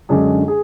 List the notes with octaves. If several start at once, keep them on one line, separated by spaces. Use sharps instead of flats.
F#2 D3 G#3 D4 G#4
G#4